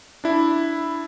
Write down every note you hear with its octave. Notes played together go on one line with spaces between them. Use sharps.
D4 E4